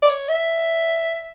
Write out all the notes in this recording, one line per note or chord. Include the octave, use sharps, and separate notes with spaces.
D5
C#5
E5